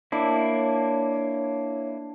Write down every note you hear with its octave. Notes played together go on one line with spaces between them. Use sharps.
A#3 D4 E4 C#5